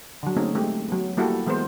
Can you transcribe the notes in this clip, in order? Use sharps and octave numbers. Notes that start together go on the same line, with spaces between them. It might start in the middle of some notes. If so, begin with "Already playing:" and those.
D3 F#3
A3 A#3 C4 C#4 D#4 G#4
G#3 A3 C4 G4
F#3 B3
G3 A#3 E4 F#4 G4 A4
E3 G#3 B3 A#4 C5